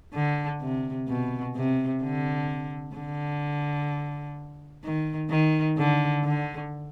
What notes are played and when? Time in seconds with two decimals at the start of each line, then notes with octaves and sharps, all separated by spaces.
0.14 D3
0.61 C3
1.09 B2
1.55 C3
2.02 D3
2.96 D3
4.84 D#3
5.30 D#3
5.78 D3
6.24 D3